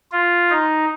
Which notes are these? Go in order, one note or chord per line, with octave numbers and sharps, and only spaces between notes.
F4
D#4